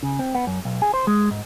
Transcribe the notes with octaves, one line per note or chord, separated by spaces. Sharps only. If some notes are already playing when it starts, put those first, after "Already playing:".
C#3
C4
B3
F#2
B1
G#4
C5
G#3
G#2